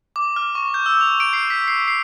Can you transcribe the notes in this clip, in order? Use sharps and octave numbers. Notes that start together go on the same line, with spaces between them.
D6
F6
C#6
G6
E6
F7
D7
C7
B6
C7
C7